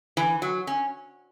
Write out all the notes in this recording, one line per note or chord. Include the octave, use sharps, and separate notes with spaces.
E3
F#3
C#4